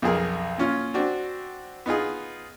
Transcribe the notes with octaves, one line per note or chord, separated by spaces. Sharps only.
B1 F2 G#4 A#4
A#2 C#4 F4
C4 D4 F#4
B3 D#4 F4 G#4